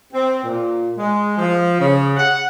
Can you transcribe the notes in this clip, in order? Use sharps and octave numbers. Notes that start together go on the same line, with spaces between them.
C4
A#2
G#3
F3
C#3
F#5